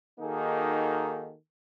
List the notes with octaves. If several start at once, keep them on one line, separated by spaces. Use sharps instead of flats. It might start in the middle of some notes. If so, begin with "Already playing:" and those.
D#3 A#3 D#4 F#4 G#4 A4